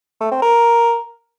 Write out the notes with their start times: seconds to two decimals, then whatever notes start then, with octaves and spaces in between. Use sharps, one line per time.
0.21 A3
0.31 C4
0.42 A#4